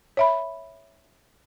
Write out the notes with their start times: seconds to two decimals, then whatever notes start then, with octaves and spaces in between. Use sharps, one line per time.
0.17 C#5 E5 B5